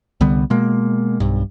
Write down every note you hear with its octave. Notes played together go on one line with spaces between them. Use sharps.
C2 D3 G3 B3
B2 G#3 A#3
B1 G2